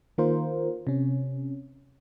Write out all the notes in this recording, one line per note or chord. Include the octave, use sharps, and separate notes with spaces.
D#3 A#3 F4 A#4 C5
C3 C#4